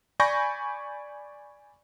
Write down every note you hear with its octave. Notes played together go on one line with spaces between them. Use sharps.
D5 G#5 B5 C#6 G6 A#6